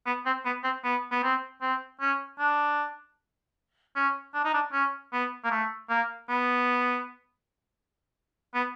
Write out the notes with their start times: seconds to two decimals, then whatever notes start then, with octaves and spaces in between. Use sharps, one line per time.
0.06 B3
0.26 C4
0.45 B3
0.64 C4
0.84 B3
1.11 B3
1.23 C4
1.62 C4
2.01 C#4
2.39 D4
3.96 C#4
4.34 D4
4.45 D#4
4.54 D4
4.73 C#4
5.13 B3
5.44 A#3
5.51 A3
5.89 A#3
6.29 B3
8.54 B3